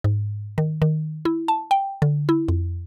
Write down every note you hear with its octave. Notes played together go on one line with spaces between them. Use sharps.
G#2
D#3
D#3
E4
A5
G5
D3
E4
F2